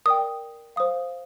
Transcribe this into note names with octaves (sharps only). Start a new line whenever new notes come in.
A#4 D5 G5 D#6
C5 F5 D#6